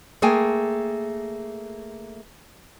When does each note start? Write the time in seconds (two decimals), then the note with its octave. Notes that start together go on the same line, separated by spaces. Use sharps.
0.22 A3 A#3 G#4 G5 G#5